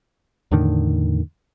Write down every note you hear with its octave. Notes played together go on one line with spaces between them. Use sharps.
E2 A2 D3 D#3